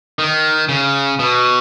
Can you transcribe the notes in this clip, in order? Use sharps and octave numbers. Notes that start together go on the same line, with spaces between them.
D#3
C#3
B2